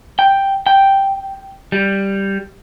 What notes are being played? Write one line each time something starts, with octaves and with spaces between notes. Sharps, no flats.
G5
G5
G3